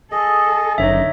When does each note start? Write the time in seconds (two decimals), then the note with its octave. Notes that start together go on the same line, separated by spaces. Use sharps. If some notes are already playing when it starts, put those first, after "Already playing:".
0.12 G#4 A4 D#5
0.78 F#1 D3 D#4 C#5 E5